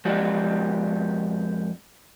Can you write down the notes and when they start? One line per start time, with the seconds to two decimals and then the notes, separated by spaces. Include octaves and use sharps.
0.05 F2 G#3 F#4 G4 D5